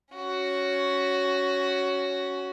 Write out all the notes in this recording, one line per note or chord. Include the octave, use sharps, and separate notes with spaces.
C#4 F#4